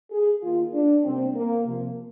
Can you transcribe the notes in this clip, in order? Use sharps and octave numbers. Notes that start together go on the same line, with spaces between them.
G#4
D#3 A#3 F4
D4
C3 G3 A#3 C4
A#3
C3 F3 A#3